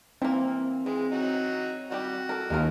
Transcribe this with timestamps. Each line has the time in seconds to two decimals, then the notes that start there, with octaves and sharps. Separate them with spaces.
0.22 E3 A#3 C4
0.86 E3 G#3
1.12 F#3 D#4 F#4
1.91 D#3 G3 F#4 G4
2.29 A4 A#4
2.50 D#2 G#3 F4 A#4